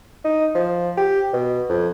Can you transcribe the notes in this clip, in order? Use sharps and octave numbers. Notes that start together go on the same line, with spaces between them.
D#4
F3
G4
B2
F2